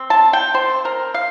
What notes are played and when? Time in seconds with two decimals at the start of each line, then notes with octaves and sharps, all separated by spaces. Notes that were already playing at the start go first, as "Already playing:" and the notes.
Already playing: C4
0.10 A5
0.33 G5
0.54 C5
0.85 A#4
1.14 F5